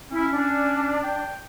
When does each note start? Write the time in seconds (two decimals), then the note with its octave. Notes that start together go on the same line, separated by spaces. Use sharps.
0.11 C#4 E4
0.32 D4
1.04 G5